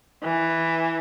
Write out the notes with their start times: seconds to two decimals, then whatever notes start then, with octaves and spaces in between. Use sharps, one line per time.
0.23 E3